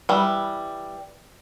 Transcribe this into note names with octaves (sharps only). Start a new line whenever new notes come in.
E3 G3